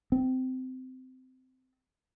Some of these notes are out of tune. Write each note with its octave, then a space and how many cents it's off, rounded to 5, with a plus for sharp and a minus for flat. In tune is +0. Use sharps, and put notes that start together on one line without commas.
C4 -20